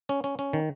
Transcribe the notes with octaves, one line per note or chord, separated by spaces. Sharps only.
C#4
C#4
C#4
D#3